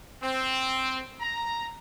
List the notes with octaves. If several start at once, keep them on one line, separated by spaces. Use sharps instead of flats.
C4
A#5